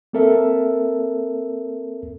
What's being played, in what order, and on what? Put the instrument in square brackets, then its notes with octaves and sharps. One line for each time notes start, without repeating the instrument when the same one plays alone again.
[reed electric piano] A#3 C4 A4 A#4 E5